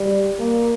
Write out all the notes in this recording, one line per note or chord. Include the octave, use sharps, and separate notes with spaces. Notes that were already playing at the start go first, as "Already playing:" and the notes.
Already playing: G3
A#3